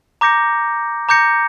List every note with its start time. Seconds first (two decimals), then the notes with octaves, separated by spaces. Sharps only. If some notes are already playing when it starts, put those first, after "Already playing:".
0.21 A#5 D6 G6 A#6 C#7
1.09 A#5 D6 G6 A#6 C#7